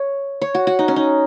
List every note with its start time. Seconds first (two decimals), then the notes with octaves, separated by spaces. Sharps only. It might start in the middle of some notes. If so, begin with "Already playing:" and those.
Already playing: C#5
0.42 C#5
0.55 F#4
0.67 F#4
0.79 D#4
0.88 C#4
0.96 D#4